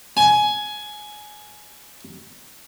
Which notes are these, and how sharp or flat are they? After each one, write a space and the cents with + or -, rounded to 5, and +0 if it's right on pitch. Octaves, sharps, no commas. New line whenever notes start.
G#5 +15